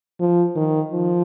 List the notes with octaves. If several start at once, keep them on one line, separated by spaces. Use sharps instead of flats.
F3
D#3
F3